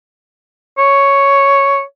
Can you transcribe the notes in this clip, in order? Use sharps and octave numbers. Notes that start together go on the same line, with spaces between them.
C#5